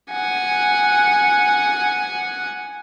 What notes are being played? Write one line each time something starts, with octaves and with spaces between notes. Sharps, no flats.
F#5 G#5